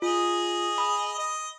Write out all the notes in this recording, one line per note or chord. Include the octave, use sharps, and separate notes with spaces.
F4 G#4 D#5
B5 D#6
D#5